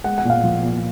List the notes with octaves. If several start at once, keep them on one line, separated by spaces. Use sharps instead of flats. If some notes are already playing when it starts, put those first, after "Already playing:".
G#3 F#5
F#5
A#2
F5
F3
A#2